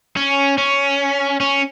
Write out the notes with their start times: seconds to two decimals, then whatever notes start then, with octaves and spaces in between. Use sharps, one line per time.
0.17 C#4
0.58 C#4
1.41 C#4